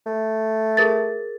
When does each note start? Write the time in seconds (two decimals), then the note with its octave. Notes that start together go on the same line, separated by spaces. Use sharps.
0.07 A3
0.77 G#4 A#4 A6